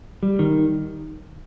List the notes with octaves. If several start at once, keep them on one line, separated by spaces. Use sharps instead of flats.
G3
D#3